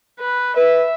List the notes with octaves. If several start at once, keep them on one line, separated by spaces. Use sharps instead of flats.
B4
B4 E5